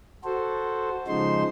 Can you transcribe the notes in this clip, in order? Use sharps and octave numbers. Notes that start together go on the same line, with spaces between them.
F#4 A4 C5
C#3 F3 G#3 D#4 C5 C6